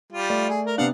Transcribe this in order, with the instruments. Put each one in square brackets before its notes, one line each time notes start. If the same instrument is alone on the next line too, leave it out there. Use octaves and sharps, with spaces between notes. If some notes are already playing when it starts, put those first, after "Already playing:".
[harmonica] G3 F4
[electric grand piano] A3 D5
[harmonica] G#4
A#4
[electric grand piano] C3 B3 D4 [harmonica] F5 F#5